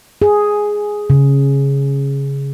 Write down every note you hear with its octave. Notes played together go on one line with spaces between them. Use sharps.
G#4
C#3